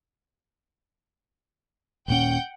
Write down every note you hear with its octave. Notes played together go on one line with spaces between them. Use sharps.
D#1 A#2 C#4 F#5 G5 G6